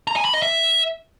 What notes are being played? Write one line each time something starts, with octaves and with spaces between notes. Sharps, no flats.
A#5
G#5
B5
D#5
E5